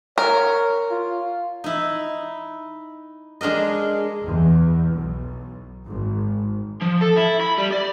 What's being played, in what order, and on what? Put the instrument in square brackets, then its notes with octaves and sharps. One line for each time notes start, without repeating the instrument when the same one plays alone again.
[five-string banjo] A#4 [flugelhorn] C#5
[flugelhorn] F4
[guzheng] D#4 E4
G#3 D4 A#4 D#5
[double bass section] E2
B1
G#1
[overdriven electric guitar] F3
A4
E4
B5
G3
D5